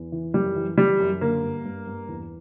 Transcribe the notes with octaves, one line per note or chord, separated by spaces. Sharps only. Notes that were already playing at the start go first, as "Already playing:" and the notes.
Already playing: E2
E3
F#2 G3
E3
E3 G3
F#2
D3 A#3
G2
G2
G2
E2